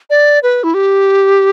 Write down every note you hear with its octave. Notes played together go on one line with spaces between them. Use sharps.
D5
B4
E4
G4